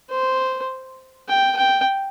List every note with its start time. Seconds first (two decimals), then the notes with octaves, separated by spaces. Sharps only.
0.10 C5
1.28 G5
1.57 G5